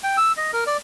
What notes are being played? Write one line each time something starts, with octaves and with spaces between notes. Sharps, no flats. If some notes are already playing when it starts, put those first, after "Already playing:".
G5
E6
D#5
A#4
D5